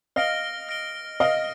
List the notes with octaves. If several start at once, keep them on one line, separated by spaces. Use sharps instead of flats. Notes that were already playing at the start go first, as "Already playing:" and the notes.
D#5 F5 F6 A#6 D7 G7
F6 A#6 D7 G7
D#5 F5 F6 A#6 D7 G7